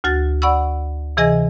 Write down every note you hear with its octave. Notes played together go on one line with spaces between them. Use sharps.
D2 F#4 A6
D5 F#5 B5 C#6 E6
C3 E3 G#4 D#5 G#5 A#6